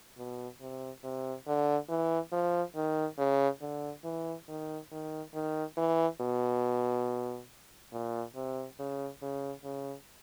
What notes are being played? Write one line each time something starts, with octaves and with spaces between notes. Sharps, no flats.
B2
C3
C3
D3
E3
F3
D#3
C#3
D3
E3
D#3
D#3
D#3
E3
B2
A#2
C3
C#3
C#3
C#3